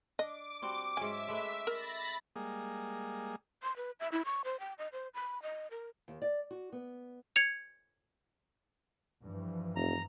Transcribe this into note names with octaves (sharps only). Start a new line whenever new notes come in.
D4 D#5 D6
G3 C4 F#4
G#2 F#3 C#4 E5 G#5
G#3 A3 B4
A#4 B5 A6 A#6
G3 G#3 A#3 G#4
C6
B4
E5
E4
C#6
C5
G5
D#5
C5
B5
D#5
A#4
D#2
D5
F#4
B3
G#6 C#7 F7
G2 E3 F3
F1 A#5